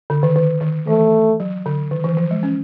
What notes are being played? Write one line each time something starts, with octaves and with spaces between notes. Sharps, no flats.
D3
D#3
D#3
D#3
E3 A3
F#3
D3
D#3
E3
F3
G#3
C#4